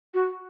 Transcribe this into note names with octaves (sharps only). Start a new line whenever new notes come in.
F#4